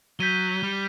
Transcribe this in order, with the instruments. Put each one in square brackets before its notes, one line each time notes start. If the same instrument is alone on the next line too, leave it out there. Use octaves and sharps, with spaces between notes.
[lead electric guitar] F#3 [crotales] G6 B6 D#7 G7
[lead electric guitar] G3